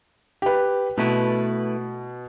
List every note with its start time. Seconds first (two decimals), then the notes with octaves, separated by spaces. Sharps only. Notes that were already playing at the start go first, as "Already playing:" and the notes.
0.42 G4 B4
0.98 B2 A3 E4 B4